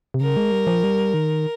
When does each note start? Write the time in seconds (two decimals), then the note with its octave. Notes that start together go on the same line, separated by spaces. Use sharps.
0.14 C3
0.21 C#3 A#4
0.37 G#3
0.52 G3
0.67 F3
0.84 G3
1.14 D#3